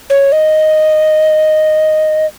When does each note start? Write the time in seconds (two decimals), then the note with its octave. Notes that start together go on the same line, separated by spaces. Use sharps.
0.10 C#5
0.32 D#5